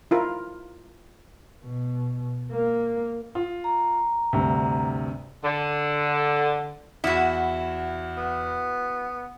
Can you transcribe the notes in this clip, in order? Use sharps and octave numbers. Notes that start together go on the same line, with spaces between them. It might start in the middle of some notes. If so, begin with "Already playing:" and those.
E4 F4 A#4
B2
A#3
F4
A#5
D2 G2 C3
D3
E2 E4 F#4 F#5
B3